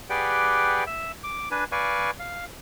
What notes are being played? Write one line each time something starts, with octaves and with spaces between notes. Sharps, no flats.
G4 G#4 B4 D5 F#5 G5
E5
D6
D4 B4 G#5
B4 D5 F5 G#5 C#6
F5